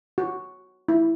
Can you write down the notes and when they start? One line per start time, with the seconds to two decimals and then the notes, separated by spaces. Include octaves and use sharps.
0.18 F#4
0.88 E4